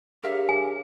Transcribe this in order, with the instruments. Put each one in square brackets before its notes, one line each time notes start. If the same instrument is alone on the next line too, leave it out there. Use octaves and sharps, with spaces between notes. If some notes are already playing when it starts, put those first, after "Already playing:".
[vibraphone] D4 G#4 C#5 [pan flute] G4 [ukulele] A#4 E5 F5
[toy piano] G#5